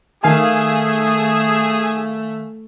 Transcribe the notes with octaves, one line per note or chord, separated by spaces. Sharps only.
D#3 A3 G#4 F5 G#5